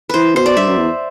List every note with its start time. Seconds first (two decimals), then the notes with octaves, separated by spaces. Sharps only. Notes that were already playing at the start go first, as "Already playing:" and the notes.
0.09 E3 B4 C5
0.35 B2 C5
0.46 D5
0.57 G2 E5
0.67 F#2
0.77 E2